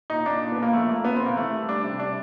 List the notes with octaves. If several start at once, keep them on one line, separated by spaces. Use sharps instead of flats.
A#2 D#4
A#2 D4
A#2
A#2 B3
A#3
F3 A3
A#2 A#3
A#2 B3
A#2 C4
A#3
E3 A3
G3
G3 D4
C3
G3 D4